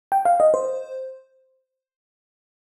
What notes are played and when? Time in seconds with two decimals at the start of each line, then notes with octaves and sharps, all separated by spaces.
0.12 G5
0.25 F5
0.40 D#5
0.54 C5